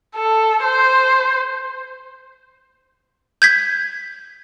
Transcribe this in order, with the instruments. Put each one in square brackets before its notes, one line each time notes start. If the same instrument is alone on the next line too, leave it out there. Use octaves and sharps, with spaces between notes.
[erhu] A4
C5
[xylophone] G6 G#6 B6